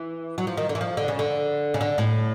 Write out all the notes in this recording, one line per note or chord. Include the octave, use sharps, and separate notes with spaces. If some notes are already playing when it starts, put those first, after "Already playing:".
Already playing: E3
F#3
F3
D#3
D3
E3
F3
D3
C#3
D3
C#3
D3
A2